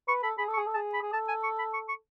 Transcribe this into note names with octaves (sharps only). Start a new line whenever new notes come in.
B4 C#6
A4 B5
G#4 B5
A4
C#6
G#4
A4
G#4 A5
B5
G#4
A4 A5
G#5
C#6
B5
C#6
C#6